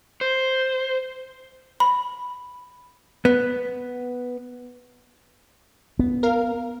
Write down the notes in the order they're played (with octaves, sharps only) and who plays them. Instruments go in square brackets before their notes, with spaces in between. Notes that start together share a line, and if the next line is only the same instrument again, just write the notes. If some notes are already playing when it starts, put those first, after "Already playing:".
[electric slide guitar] C5
[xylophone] B5
[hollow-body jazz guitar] B3
[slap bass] B3
[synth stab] A#4 F5